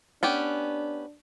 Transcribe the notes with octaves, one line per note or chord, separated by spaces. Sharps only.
B3 C#4 D4 G4